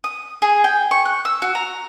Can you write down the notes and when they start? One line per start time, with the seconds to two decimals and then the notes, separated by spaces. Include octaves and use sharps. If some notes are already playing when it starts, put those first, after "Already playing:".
0.04 D#6
0.42 G#4
0.64 G5
0.91 C#6
1.05 F#6
1.25 E6
1.42 F#4
1.55 A#5